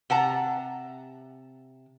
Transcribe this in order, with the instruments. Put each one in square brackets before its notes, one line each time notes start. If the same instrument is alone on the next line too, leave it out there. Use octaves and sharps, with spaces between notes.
[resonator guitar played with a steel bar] C3 F#5 A5 A#5